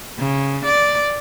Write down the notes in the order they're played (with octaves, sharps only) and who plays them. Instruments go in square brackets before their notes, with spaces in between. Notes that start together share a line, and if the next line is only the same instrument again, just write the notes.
[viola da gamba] C#3
D5